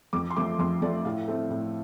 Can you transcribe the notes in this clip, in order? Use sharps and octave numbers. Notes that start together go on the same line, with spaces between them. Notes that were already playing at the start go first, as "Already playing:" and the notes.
F2 D6
C6
F3 A3 D6
F2 C6
F3 A3 D5
A2 F5
A3 C4
A2